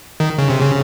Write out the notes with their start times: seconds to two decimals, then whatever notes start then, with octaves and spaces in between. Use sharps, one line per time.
0.20 D#3
0.38 C#3
0.50 C3
0.62 C#3